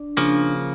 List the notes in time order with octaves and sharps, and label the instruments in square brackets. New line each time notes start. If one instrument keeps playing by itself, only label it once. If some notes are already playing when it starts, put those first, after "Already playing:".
Already playing: [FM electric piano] D4
[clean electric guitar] C#3 F3 A#3